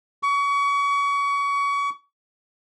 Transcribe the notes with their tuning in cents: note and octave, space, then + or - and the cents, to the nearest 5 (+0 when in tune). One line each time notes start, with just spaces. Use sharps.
C#6 +30